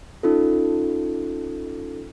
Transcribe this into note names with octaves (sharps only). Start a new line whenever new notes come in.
C#4 D#4 F4 A4